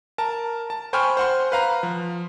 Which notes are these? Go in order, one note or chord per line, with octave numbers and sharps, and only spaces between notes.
A#4 A5
A5
C5 G5 G#5 B5 C#6 F6
C5 F#5 C6
B4 F5 A#5
F3